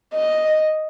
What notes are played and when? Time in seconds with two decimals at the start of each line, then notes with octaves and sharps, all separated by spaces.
0.14 D#5